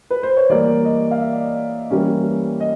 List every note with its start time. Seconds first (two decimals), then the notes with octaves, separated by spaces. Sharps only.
0.10 B4
0.23 C5
0.37 C#5
0.50 E3 G3 A#3 D5
0.85 D#5
1.11 F5
1.20 E5
1.90 E3 G3 A#3 C#4
2.60 D#5